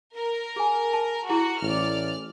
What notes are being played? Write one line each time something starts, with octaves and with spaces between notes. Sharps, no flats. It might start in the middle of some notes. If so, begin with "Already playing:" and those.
A#4
G#4 G#5
A5
E4 F#4 G#4
A1 D5 F6